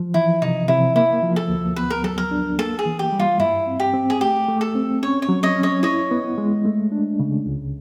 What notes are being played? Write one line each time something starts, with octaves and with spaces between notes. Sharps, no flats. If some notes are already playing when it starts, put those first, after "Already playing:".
Already playing: F3
E3 E4
C3 D#4
C3 E4
A#3 E4
F3
A4
D2
B3 B4
A#4
F#3 A4
A#4
D4
A#3 A4
G#4
E3
G4
G3
F4
G2 E4
C4
G4
C4
G#4
A3 G4
A3
A4
C4
C#4 C#5
C#5
F#3
C#5 D#5
C#4
C#5 D#5
E4 C#5 D#5
B3
G#3
A3
D4
C#3
C#2